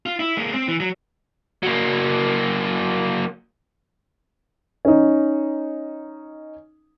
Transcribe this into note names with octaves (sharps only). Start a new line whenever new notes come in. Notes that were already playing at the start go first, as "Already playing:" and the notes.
F4
E4
G#3 A#3
C4
E3
F#3
F#3 A#3
C#4 D#4